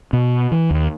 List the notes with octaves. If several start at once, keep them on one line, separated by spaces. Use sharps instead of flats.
B2
E3
D#2